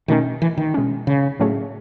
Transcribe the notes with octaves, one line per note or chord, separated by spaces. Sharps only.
B2 D#3 A3 C#4
E3
D#3
B2 G#3 C#4
C#3
A2 F#3 A3 C#4 G#4